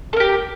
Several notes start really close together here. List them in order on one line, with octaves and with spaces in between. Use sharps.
A4 A#4 G4